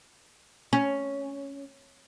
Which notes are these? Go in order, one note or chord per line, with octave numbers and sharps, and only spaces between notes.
C#4